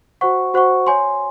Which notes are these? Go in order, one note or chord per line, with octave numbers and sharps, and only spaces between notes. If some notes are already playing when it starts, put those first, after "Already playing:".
F#4 C5 F#5 C#6
F#4 C5 F#5 C#6
C#5 G#5 C6